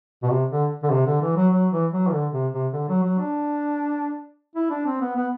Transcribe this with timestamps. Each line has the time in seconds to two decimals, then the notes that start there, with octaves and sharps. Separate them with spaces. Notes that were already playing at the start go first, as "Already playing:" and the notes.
0.23 B2
0.30 C3
0.51 D3
0.83 D3
0.91 C3
1.06 D3
1.21 E3
1.36 F#3
1.52 F#3
1.71 E3
1.92 F#3
2.07 E3
2.12 D3
2.32 C3
2.53 C3
2.73 D3
2.88 F#3
3.03 F#3
3.18 D4
4.55 E4
4.70 D4
4.86 C4
5.01 B3
5.16 B3